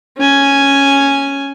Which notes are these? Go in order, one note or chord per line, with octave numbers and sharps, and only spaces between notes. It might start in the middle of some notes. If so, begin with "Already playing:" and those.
C#4 G#5